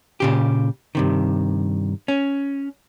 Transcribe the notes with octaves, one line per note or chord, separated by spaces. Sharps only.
A#2 C#3 G4
G2 C3 D#3
C#4